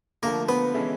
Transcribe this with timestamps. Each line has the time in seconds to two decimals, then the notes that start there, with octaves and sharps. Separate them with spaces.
0.23 D3 F3 A3 A#3 A#4
0.49 B3 B4
0.74 E3 G#3 C#4 E4 A4